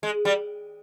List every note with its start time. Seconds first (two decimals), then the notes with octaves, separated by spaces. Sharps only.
0.03 G#3
0.25 G3